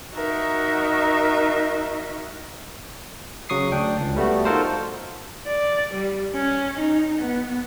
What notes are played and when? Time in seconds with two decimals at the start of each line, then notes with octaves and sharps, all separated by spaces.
0.15 D#4 F#4 A#4 E5
3.49 C#3 F#3 C#6 D#6 C7
3.72 D2 D4 G5
4.00 C#2
4.16 G3 A3 B3 F#4
4.45 D#4 F4 F#4 A4 A#4 C5
5.47 D5
5.94 G3
6.34 C#4
6.79 D#4
7.19 B3